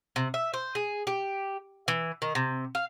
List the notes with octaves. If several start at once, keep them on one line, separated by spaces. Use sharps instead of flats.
C3
E5
C5
G#4
G4
E3
D#3
C3
F5